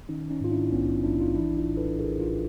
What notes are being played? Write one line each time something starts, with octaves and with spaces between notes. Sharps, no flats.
D#3 C#4 D#4
C#4 D#4
G#2 F4
D4 E4
A#1 B3 C#4
A#1 D4 E4
D#4 F4
E3 D4 E4
D#4 F4
A2
A4 B4
A#1 G#4 A#4
D#4 F4